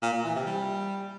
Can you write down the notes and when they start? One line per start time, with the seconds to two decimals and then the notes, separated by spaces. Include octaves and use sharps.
0.02 A#2
0.13 A#2
0.24 E3
0.35 C3
0.46 G3